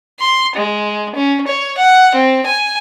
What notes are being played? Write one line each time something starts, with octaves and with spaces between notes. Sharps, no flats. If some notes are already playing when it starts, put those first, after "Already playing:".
C6
G#3
C#4
C#5
F#5
C4
G#5